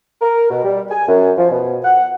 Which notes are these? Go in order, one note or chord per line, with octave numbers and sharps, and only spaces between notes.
A#4
B2
G3
G#5
F#2
F3
B2
F#5